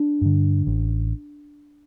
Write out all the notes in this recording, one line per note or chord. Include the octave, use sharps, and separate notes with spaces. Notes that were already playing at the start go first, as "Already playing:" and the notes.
Already playing: D4
G2 D3
A1